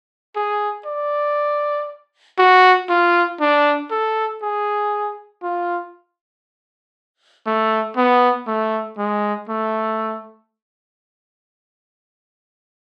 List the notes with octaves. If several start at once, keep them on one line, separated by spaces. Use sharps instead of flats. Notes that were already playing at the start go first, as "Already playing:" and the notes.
G#4
D5
F#4
F4
D4
A4
G#4
F4
A3
B3
A3
G#3
A3